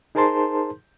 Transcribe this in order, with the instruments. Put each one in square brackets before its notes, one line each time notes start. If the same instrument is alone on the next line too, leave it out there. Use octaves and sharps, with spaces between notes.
[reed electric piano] D#4 G#4 A#4 C5 A5 C6